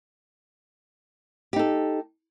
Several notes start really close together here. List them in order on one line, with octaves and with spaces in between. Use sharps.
G4 D#4 A4